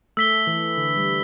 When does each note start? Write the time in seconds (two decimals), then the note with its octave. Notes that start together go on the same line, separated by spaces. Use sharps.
0.17 A3 E6 B6 G7
0.47 E3
0.77 D3
0.97 G3